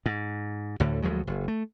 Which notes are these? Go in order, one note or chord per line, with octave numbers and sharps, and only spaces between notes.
G#2
D2 A2 D3
D2 F3 F#3 G#3
F#1
A3